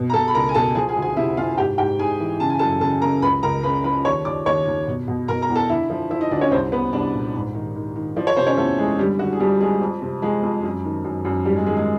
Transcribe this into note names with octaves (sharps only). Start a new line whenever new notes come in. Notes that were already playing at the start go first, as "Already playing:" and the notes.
Already playing: B2
A#5
B2 A4 A5
B5
C#2 A#4 A#5
G#5
B2 A4 A5
F3 G#4 G#5
G#4 G#5
D2
G#4 G#5
C3 E4 E5
C3 F4 F5
G#2 G4 G5
G#2 G4 G5
G#2 G#4 G#5
E3
C#3 A5
G#5
F#2 A4 A5
C#3 A4 A5
C#3 A#4 A#5
C#2 B4 B5
C#2 A#4 A#5
C#3 B4 B5
F3 B4 B5
D#2 C#5 C#6
D#2 D5 D6
D#2 C#5 C#6
D#2
B2
B2
B2 A#4 A#5
A#4 A#5
E2
A4 A5
D3 E4 E5
F3
F3 E4 E5
D#4 D#5
D2 D4 D5
C#4 C#5
C2 C4 C5
C2 B3 B4
C2 D4 D5
A#2
G#2
D#3
D#3
D#3
F3 D5
C#5
C3 C5
C#4 C#5
E2 A3 A4
E2 G#3 G#4
D3 G3 G4
D3 F#4
G#4
F2 G3 G4
F2 G#3 G#4
F2
C3
F3 G#3 G#4
F2
F#2
D#3
F#2
F#2
G#2 G3 G4
G#3 G#4
D#3 G#3 G#4
G#3 G#4